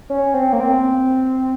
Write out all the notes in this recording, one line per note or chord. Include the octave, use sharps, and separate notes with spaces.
C#4
C4
A#3
C4